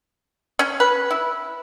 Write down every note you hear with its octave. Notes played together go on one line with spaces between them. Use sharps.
C#4
B4
E4